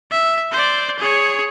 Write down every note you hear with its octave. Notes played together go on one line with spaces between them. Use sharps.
E5
C5 D5
G#4 C#5